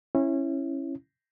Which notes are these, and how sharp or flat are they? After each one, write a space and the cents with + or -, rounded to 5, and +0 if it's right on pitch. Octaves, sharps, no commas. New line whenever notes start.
C#4 -25 E4 +0